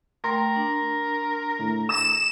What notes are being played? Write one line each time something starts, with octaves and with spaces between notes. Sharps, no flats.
A3 A#4 G5 C6 A#6
D4
A2
D#6 A#6 E7